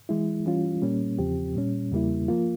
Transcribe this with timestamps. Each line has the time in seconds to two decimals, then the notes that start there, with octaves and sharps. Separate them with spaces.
0.09 E3 G#3 E4
0.46 E3 G3 C#4 F4
0.82 A#2 G3 A#3 C#4
1.19 E2 C#3 F3 C4 G4
1.55 A#2 G3 C#4
1.91 E2 C#3 G3 A#3 E4
2.28 F3 A#3 F4